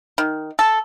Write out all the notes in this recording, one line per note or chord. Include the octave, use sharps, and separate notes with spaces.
D#3
A4